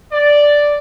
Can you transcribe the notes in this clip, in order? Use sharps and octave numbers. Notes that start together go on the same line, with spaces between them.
D5